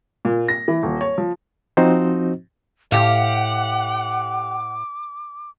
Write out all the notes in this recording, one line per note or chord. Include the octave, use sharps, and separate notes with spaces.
A#2
A#6
E3
D#1
C#5
F3
F3 C4 D#4 F#4 C5 D#5
A2 G4 F5 F#5 D6